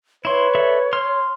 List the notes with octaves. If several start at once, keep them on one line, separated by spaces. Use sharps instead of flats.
E4 B4 C#5 C6
A4 D5 E5
C6 F6